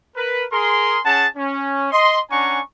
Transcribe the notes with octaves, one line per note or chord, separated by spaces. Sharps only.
A#4 B4
G#4 A#4 C6
C#4 G#4 F#5 A5
C#4
D#5 C6
C#4 D4 F#5 G#5 A#5 C#6